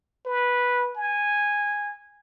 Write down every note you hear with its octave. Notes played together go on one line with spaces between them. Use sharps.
B4
G#5